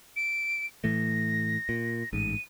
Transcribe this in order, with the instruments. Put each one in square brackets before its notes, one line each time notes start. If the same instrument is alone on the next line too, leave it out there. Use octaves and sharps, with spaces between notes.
[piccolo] D7
[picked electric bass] A2 E3 A3 [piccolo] A#6
[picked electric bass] A#2
[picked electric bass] A1 G#2 [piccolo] D#7